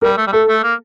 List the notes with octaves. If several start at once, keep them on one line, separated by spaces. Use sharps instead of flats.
G3 A#4
A3
G3
A3 A4
A3
A#3